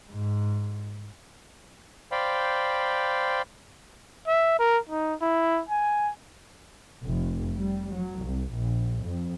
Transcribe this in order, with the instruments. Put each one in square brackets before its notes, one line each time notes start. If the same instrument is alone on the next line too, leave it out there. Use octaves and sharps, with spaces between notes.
[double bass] G#2
[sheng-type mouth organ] C5 D5 F5 G5 B5
[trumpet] E5
A#4
D#4
E4
G#5
[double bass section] F1
G3
F#3
C2
A#1
F2